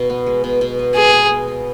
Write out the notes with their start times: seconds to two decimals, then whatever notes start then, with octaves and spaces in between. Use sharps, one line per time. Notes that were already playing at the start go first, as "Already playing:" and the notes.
Already playing: B2
0.10 B3
0.26 G#3
0.44 B2
0.61 B2
0.79 B3
0.95 G#3 G#4
1.13 B2
1.31 B2
1.47 B3